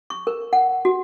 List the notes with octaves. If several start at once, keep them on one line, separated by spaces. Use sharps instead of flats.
C#6
A#4
F#5
F#4